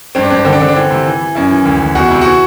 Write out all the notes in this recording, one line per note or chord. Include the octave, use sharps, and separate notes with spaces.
G2 C4
D4
G2 C4
D4
D3 C4
D4
D3 C4
D4
E3 C4
C3
E3
E3
F#2 E4
E3
D2
D2
E2 F#4
C3 E4
E3 F#4